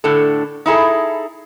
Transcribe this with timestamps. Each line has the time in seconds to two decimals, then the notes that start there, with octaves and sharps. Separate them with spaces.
0.04 A2 D3 A4
0.66 D#4 E4 G#4 A4